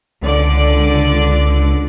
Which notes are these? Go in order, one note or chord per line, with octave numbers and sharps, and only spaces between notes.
C#2 D3 D5